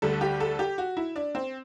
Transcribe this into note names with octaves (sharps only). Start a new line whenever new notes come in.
D2 D3 G3 A4
G4
A4
G4
F#4
E4
D4
C4